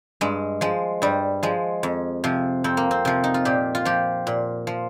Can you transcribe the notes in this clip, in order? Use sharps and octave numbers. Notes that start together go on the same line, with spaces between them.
G2 G#3
F3 G#3
G2 G3
F3 G#3
F2
C3 F3
F2 C4
A#3
C4
C3 F3
D#4
F4
A#2 G4
F4
F3 G4
A#2
F3